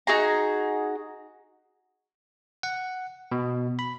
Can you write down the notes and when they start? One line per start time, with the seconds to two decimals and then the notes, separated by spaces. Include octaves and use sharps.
0.07 D#4 F#4 G#4 A#5
2.63 F#5
3.32 B2
3.79 B5